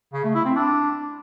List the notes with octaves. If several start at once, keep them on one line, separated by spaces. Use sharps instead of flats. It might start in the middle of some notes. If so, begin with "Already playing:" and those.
C#3
A3
E4
C4
D4